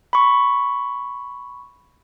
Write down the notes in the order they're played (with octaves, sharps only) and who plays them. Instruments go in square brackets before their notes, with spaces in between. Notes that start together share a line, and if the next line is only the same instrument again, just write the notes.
[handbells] B5 C#6